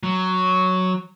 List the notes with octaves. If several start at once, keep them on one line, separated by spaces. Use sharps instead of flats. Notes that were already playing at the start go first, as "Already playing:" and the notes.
F#3